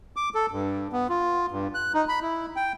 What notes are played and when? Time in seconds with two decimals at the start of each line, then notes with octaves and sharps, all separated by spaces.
0.16 D6
0.35 A4
0.51 G2
0.93 B3
1.09 F4
1.51 G2
1.74 F#6
1.94 D#4
2.09 B5
2.22 E4
2.56 G5